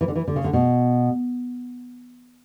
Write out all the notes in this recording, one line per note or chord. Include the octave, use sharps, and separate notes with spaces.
E3
D3
E3
D3
C#3
D3
B2